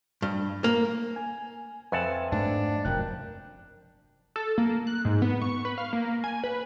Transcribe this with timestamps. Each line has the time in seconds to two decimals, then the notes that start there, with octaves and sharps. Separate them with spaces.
0.22 G2
0.64 A#3
1.16 G#5
1.92 F2 B4 E5 F#5 G#5 A5
2.32 G#2 A3 D4
2.85 F1 F#2 A#4 G5 F#6
4.36 A4
4.58 A#3
4.87 F#6
5.05 G#2
5.22 B3
5.42 C#6
5.65 B4
5.78 F5
5.93 A#3
6.24 G#5
6.44 B4